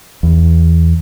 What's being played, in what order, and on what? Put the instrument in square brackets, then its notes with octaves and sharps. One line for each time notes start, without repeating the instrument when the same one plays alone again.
[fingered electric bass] E2